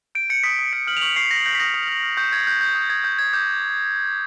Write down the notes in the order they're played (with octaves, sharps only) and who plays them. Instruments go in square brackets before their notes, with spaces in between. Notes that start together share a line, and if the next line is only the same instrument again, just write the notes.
[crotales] G6 D7
G6 C#7
D#6 B6
D#6
F6 C#7
F6 F#7
F7
C#6 F#7
C#6 C7
G6 A#6
G6 A#6
B6
D#6 A#6
D#6
F6
F6
C#6 G6
C#6 G#6
F#6 G6
F#6 G6
D#6
D#6 G#6
G6
G6 G#6
D6 G6